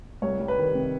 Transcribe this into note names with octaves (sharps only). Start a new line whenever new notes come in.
C2 C#5
G3
B4
D#3
C3